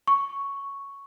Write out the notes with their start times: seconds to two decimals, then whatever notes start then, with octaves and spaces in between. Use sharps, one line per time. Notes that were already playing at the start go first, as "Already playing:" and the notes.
0.07 C#6